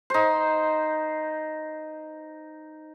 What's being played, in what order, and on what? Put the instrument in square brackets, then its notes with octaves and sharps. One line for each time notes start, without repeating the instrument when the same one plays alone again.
[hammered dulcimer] D#4 C5